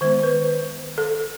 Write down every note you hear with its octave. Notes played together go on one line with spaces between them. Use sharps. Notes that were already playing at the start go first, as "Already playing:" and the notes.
D#3 G#3 B3 C5
B4
A4